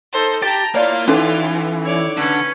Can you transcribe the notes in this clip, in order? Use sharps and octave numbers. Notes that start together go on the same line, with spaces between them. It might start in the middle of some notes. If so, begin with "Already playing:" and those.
D#4 A4 C5
G4 G5 A5 A#5 A6
A#3 E4 F4 C#5 D5 F5
E3 C#4 D#4 A4
E4 C#5 D5
D3 C#4 B4